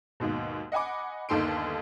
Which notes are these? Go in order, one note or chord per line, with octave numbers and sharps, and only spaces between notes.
D#2 G#2 B2
D#5 F#5 G#5 B5 D6
G1 D#2 D#3 A4 C6 D7